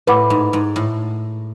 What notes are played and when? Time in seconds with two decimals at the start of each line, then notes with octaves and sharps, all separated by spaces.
0.07 A2 B4 F#5 B5 D6
0.30 G#2
0.53 G#2
0.76 A2